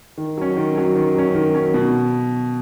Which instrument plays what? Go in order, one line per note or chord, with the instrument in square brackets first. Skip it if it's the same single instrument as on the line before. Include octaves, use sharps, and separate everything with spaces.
[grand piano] D#3
F#3 C#4
D#3
F#3 C#4
D#3
F#3 C#4
D#3
F#3 C#4
B2